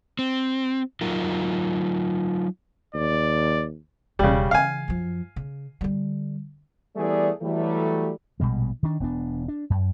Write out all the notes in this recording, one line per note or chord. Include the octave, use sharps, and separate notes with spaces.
C4
F#3 D#4 F4 A#4
D#2 D5
E1 C#3 G3 D4
C#3 E3 F5 G#5
F#2 F3
C#3
D3 G3
E3 G3 A3 B3 G#4 D5
E3 F#3 G3 A3
A#1 B2 G3 G#3
D#3 D4
E1 B3 D4
D4
F#2